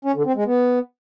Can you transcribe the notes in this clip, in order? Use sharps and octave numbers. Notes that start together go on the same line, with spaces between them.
C#4
D3
C4
G#3
B3